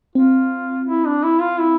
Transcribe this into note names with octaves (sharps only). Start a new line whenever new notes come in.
C4 F4
E4
D4
E4
F4
E4